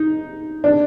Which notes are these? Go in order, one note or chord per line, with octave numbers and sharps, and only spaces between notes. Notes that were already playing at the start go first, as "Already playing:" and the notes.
Already playing: D#4
D4